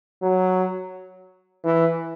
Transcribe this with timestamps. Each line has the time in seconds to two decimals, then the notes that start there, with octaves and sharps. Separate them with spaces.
0.22 F#3
1.64 E3